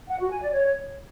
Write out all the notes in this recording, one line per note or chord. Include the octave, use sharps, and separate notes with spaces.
F#5
F#4
G#5
D5
C#5